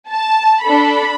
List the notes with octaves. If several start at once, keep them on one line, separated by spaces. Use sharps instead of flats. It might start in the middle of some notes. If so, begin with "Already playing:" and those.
A5
D4 A4 B5